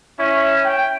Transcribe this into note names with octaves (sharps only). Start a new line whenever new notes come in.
C#4 E4
G5